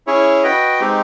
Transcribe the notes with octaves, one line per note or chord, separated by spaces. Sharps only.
C#4 E4 G#4 C#5
F#4 B4 D#5 G5
G#3 C4 D#4 G4